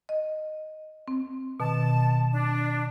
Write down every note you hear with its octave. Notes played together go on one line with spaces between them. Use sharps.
D#5
C4
B2 D#3 A5
D4